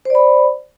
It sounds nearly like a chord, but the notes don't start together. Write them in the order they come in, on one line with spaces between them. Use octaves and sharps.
C5 D5 B5